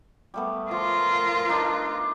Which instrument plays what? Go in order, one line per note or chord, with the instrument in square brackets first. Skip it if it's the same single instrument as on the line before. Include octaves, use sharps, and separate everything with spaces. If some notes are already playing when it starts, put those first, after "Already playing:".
[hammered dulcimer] G3 A3 B3
[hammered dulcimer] F3 [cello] F4 A#4
[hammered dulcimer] D4 D#4 B4